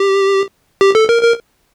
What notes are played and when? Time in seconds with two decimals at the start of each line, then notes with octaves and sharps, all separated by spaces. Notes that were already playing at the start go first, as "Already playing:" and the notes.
Already playing: G4
0.81 G4
0.95 A4
1.09 A#4
1.23 A#4